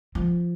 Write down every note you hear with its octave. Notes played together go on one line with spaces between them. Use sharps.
F3